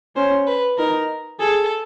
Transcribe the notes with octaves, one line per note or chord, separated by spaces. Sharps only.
C#4 C5
B4
D#4 A#4
G#4 A4